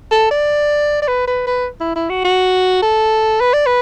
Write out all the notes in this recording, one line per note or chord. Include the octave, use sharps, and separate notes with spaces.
A4
D5
D5
B4
B4
B4
E4
E4
F#4
F#4
A4
B4
D5
B4